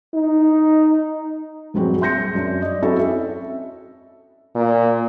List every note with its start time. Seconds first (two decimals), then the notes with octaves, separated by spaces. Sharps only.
0.14 D#4
1.74 A#1 G2 F#3 C4 F#4 G#4
2.01 E5 C6 G6 A#6 C#7
2.35 F#2 D4
2.62 D5 D#5
2.82 C4 C#4 E4 F#4 A4 E5
2.99 E5
4.55 A#2